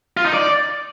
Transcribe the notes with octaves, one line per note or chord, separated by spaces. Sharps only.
F4
D#4
D5